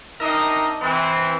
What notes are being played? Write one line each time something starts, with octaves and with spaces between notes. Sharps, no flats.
C4 D4 D#4 A#4 D#5 E5
E3 C4